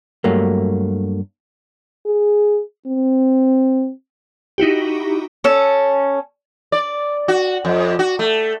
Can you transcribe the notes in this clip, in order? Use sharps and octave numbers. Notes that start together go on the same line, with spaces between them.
G2 F#3 A3 A#3
G#4
C4
D#4 E4 F#4 G4
C#4 A4
D5
F#4
F2
F#4
A3